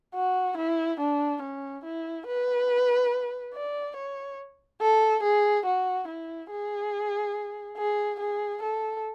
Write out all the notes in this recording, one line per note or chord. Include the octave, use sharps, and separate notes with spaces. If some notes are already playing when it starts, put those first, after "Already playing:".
F#4
E4
D4
C#4
E4
B4
D5
C#5
A4
G#4
F#4
E4
G#4
G#4
G#4
A4